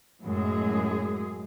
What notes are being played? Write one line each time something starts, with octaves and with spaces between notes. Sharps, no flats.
F#2 A2 G#3 G#4